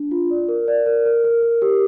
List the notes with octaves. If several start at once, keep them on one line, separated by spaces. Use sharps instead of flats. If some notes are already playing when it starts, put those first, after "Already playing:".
Already playing: D4
F4
D5
A#4
D5
A#4
A#4
A#4
A#4
G4